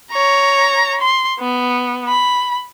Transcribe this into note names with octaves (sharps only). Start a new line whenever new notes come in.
C#5 A#5
C6
B3
B5